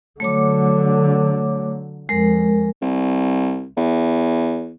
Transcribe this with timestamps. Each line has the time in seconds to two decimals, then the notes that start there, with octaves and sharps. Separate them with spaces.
0.20 D3 F#3 A3 C#5 D6
2.09 F2 G#3 A#4
2.82 C2
3.77 E2